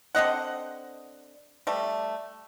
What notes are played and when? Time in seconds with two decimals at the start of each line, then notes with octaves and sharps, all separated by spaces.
0.15 D3 C4 D#5 F#5
1.67 G3 A3